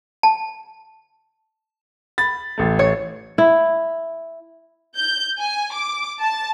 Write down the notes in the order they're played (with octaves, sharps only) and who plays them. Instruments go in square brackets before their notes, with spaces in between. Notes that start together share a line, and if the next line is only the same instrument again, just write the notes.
[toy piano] A5
[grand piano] B5 A6
A1 A3
[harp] C#5
[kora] E4
[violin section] G6
G#5
D6
A5